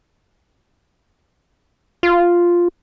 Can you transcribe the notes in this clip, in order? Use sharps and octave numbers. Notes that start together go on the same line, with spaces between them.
F4